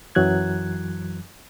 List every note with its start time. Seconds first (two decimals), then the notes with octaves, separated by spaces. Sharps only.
0.15 F#2 E3 F#3 F#6 G#6